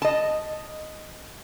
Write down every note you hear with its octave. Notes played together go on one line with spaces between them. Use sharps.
D#5 A5